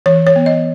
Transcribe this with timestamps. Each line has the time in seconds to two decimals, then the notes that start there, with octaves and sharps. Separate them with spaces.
0.06 E3 C#5
0.27 C#5
0.36 B3
0.46 D#5